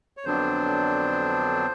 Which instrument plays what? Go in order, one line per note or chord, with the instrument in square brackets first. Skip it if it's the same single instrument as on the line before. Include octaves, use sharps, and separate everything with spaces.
[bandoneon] C#5
F2 D3 F#3 B3 D4 C5